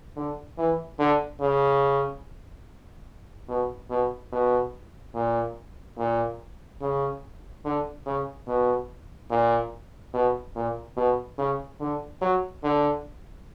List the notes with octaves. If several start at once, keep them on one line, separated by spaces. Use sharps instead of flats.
D3
E3
D3
C#3
B2
B2
B2
A#2
A#2
C#3
D3
C#3
B2
A#2
B2
A#2
B2
C#3
D3
F#3
D3